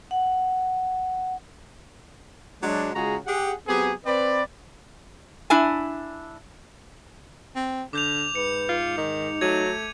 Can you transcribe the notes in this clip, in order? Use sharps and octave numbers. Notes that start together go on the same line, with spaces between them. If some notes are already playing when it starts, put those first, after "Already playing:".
F#5
F#3 G#3 D4
C#3 G#3 F4 F#4 G#4 A#5
G4 G#4 F#5
F#3 B3 C4 G4 G#4
C4 B4 D5
D4 E4 G#5
C4
D3 D6 G6 F7
G#2 B4 C#7
F4
D#3 D#4
F#3 A3 G#6 D#7